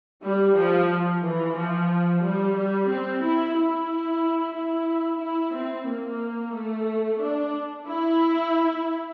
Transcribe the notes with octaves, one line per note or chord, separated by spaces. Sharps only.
G3
F3
E3
F3
G3
G3
C4
E4
E4
E4
E4
C4
A#3
A3
D4
E4